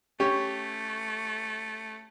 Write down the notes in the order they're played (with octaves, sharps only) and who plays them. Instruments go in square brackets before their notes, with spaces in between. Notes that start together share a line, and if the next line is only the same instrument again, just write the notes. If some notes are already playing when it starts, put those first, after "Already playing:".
[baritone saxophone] A3 [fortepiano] C#4 G4 C#5